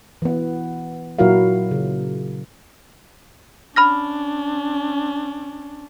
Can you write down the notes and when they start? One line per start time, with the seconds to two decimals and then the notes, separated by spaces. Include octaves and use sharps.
0.22 E3 B3
1.19 A#2 F#3 E4 F#4 A#4 F5
1.71 C#3
3.76 C#4 D4 B5 F6 A#6